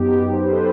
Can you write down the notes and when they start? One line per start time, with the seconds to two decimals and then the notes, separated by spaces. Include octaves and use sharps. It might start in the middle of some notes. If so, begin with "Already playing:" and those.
Already playing: F#2 F#3 B3 D#4 G4
0.33 C5
0.43 B4
0.52 A4